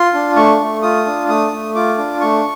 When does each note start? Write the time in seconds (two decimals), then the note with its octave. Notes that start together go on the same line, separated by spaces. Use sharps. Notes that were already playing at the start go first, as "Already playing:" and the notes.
Already playing: F4 C6
0.14 D4
0.36 A3 C#6
0.60 A3
0.82 F4 D#6
1.06 D4
1.28 A3 D#6
1.52 A3
1.75 F4 D6
1.98 D4
2.21 A3 C#6